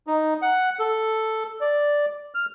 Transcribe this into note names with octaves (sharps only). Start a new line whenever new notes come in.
D#4
F#5
A4
D5
F6